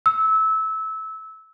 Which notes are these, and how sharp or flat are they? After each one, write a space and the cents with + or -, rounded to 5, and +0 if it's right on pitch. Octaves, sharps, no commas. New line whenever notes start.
E6 -20